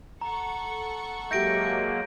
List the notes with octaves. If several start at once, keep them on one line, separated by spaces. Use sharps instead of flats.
A4 F#5 A#5 C#6
F#3 G#3 A#3 G4 E5 G6 A#6 D7